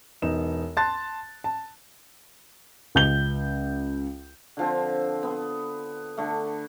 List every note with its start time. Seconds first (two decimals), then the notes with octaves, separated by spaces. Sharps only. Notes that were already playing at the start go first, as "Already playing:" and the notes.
0.22 E1 B3 D#4 E7
0.77 A5 C6 F#6 A6
1.44 A5
2.95 C#2 G6 G7
4.57 D3 F3 C4
5.23 B3
6.17 D3 A3